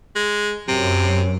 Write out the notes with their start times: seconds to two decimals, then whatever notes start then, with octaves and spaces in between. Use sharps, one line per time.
0.16 G#3
0.68 F#2 C3